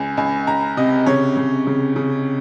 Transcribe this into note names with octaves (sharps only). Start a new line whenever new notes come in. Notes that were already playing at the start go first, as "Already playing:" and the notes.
Already playing: C#2 G#5
C#2 G#5
C#2 A#5
C3 D#5
C#3 C#5
C#3
C#3
C#3